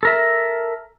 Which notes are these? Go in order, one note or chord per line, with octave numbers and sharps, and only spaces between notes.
A4 A#4 E5